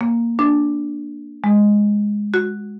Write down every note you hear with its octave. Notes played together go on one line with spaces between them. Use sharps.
A#3
D4
G#3
F#4